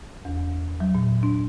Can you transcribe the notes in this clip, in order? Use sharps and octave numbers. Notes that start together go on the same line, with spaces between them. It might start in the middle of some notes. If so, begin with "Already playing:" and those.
E2
F#3
A#2
D4